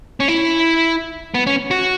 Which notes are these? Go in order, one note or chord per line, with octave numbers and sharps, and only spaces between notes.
C#4
E4
B3
C#4
F#4